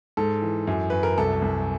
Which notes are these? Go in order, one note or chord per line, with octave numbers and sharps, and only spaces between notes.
G#2 A4
E3
F#2
F#2 B4
A#4
C2 A4
C2